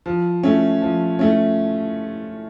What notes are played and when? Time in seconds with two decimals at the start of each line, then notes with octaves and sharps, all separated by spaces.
0.06 F3
0.43 A3 C#4
0.82 F3
1.19 A3 C#4